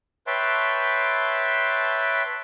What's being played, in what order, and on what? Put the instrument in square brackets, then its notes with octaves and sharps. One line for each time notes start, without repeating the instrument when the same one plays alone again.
[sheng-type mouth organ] B4 C#5 E5 G5 A5 C6